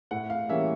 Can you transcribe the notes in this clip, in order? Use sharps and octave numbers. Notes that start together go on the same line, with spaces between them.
A2 F#5
F5
E3 G3 A#3 C#4 E5